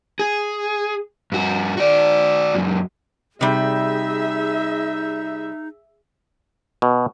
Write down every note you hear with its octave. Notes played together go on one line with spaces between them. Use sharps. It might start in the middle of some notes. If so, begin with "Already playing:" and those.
G#4
G2 F#4
F#4 D5
C#2 F#2
C3 G3 D#4 G#4 E5
B2